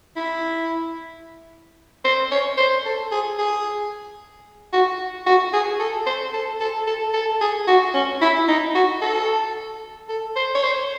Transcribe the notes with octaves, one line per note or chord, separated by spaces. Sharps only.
E4
C5
C#5
C5
A4
G#4
G#4
F#4
F#4
G#4
A4
C5
A4
A4
A4
A4
G#4
F#4
C#4
E4
D#4
F#4
A4
A4
C5
C#5
C5